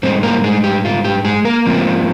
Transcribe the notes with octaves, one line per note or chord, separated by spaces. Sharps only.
G#2 G3 C4 C5
A#3 A#4
G#3 G#4
G4
F4
G4
G#3 G#4
A#3 A#4
G#2 F3 C4 F4